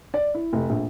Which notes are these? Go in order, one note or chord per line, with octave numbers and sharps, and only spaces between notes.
D5
E4
F1
A#1